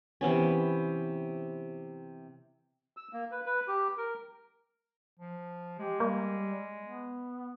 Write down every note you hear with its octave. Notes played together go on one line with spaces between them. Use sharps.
C3 E3 B3 C#4
E6
A#3
B4
B4
G4
A#4
F3
G#3 G4
G3 A#3
B3